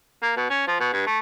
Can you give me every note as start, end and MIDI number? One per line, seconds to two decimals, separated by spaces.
0.22 0.36 58
0.37 0.47 47
0.50 0.64 61
0.67 0.78 53
0.80 0.90 47
0.93 1.03 43
1.07 1.20 57